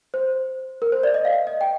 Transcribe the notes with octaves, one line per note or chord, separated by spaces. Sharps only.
C5
A#4
C5
D5
D#5
F5
D#5
G5